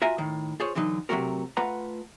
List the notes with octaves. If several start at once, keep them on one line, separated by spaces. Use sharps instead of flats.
F4 F#4 E5 G#5 A#5
A2 D#3
F4 G#4 C5 C#5
D3 E3 F#3 D#4
C3 D#3 F#3 A3 F#4 A#4
A3 F4 B4 F#5 A#5